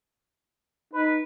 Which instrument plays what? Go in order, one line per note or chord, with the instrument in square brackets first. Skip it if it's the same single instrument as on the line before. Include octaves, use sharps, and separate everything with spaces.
[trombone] D#4 [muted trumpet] B4